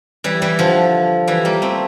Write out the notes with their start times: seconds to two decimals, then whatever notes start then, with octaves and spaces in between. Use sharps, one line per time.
0.24 E3 G3
0.42 E3 G3
0.59 D3 F3
1.28 E3 G3
1.45 G3 A#3
1.62 A3 C4